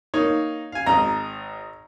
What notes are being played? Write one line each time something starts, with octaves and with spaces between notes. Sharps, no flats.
A#3 D#4 C#5
F5 G#5
G#1 D#5 A#5